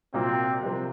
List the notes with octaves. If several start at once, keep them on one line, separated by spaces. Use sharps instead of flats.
C2 A#2 F#3 A#3 C4
C2 C3 F3 C4